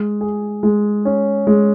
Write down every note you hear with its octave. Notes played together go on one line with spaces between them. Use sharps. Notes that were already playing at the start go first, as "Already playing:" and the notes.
Already playing: G#3
G#4
G#3
C#4
G#3